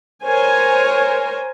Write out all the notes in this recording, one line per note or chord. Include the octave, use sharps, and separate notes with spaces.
A#4 C5 C#5 G#5